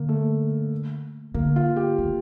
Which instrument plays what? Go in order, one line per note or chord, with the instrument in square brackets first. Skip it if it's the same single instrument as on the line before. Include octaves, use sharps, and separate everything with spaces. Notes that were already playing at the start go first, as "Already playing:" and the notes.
Already playing: [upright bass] D3 [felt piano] A#3
[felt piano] A3
[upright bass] D3 [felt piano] A#3
[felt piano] F4
G4
[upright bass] D#3